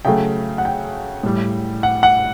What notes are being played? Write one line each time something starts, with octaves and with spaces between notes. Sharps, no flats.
C#3 F#3 A3 G5
F#5
G5
A2 G3
F#5
F#5